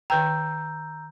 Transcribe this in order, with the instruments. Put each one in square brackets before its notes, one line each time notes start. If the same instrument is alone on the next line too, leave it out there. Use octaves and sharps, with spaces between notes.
[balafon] D#3 B4 G5 [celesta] A#5 E6 G6